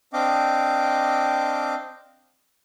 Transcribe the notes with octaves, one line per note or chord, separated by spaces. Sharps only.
C4 D4 D#5 F5 G5 D6